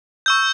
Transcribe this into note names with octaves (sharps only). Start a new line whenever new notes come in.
C#6 E6 G6